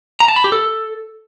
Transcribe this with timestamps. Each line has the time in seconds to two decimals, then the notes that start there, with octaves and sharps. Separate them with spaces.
0.20 A#5
0.28 A5
0.36 B5
0.44 G4
0.52 A4